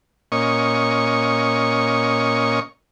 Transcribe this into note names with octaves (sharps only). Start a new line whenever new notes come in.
A#2 C#4 D#5 C#6